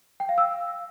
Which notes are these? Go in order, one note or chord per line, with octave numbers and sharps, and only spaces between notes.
G5
F5
E6